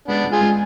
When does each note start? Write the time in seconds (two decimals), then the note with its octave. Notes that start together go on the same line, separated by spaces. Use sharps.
0.08 G#3 B3 D4
0.24 G#3
0.32 F4 G#4
0.41 G#3